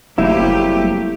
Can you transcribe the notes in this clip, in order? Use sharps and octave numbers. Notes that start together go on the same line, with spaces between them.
F#1 F#3 G3 A3 A#3 C4 E4 G4